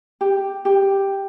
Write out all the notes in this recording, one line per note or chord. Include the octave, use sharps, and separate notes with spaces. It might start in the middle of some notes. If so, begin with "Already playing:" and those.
G4
G4